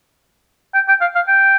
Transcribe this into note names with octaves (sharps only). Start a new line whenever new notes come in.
G5
G5
F5
F5
G5